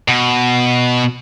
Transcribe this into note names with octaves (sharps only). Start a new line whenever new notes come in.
B2